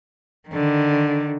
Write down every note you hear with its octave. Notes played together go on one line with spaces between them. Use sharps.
D3 D#3